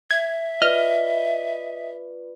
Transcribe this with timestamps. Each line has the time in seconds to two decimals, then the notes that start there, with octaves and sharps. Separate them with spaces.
0.11 E5 G#6
0.62 F4 B4 D5 D#5 F6